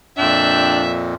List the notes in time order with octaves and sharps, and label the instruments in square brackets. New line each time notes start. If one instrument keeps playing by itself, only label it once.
[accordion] F2 A#2 [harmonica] D4 G5 [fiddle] E5